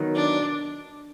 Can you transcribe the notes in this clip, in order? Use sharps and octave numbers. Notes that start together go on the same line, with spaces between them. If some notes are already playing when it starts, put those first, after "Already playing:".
Already playing: D#3 F#3 B3 D#4
D4